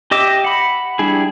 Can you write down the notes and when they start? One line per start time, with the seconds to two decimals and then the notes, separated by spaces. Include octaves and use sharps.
0.11 G4 D#5 E5 D6
0.44 F#5 B5
0.99 G3 D4 E4 G#4